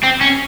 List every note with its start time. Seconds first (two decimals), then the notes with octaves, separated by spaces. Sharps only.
0.03 C4
0.21 C#4